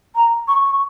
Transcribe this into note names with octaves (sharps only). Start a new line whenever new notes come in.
A#5
C#6
C#6